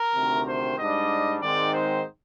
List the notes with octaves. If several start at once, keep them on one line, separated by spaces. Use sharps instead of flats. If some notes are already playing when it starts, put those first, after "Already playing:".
Already playing: A#4
D2 C3 D#3
C5
G#2 G3 D4 D#5
G#2 D#3 G#3 C4 D#4 D5
C5